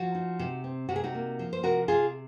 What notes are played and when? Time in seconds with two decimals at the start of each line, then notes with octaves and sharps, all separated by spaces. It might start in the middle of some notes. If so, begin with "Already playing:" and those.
Already playing: F3 F#4
0.15 D#4
0.39 C3
0.64 C4
0.89 C3 F#4
0.96 G#4
1.04 D#4 F#4
1.15 A#3
1.39 F3
1.53 C5
1.63 C3 F#4 A#4
1.88 C3 F4 G#4